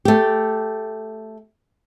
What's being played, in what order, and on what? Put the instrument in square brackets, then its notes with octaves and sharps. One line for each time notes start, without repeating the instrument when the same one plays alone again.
[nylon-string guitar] A3 G4